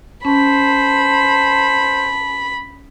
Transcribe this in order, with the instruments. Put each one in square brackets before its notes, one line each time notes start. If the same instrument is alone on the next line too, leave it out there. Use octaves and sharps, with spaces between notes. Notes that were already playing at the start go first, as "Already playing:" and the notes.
[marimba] C#4 [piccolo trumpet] C5 [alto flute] A5 [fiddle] B5